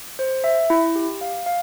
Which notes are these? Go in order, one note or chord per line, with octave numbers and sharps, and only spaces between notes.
C5
E5
E4
G4
F5
F5